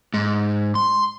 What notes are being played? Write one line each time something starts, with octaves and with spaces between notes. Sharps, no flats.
G#2
C6